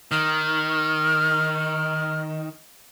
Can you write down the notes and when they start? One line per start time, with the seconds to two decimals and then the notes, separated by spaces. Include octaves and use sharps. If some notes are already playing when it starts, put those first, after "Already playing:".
0.12 D#3 F6